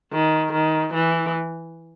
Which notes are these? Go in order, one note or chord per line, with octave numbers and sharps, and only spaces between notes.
D#3
D#3
E3